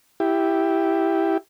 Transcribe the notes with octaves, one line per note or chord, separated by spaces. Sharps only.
E4 G4